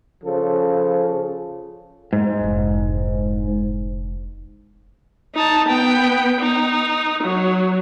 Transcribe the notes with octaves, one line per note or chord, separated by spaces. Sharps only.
C#3 F3 A4 C5
G#2
F1 E4
D#4 A5
B3 G5
D#4
F#3